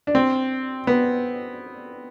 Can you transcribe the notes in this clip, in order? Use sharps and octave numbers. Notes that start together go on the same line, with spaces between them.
D4
C4
B3